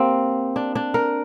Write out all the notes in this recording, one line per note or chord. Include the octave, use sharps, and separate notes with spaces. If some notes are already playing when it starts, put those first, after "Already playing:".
Already playing: A#3 C4 G4
D4
D4
A#4